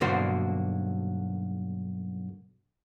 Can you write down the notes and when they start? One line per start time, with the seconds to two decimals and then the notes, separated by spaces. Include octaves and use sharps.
0.01 B1 G2 D3 A#3 F#4 C5